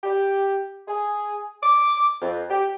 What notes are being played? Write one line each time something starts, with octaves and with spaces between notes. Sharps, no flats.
G4
G#4
D6
F2
G4